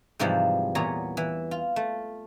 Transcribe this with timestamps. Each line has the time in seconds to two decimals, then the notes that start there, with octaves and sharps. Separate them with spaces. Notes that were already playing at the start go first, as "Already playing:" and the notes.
0.19 G#2 C3 E3 F3 G3 G#3
0.75 E2 A#2 B3 C#5 A#5
1.17 E3
1.51 F4
1.76 A3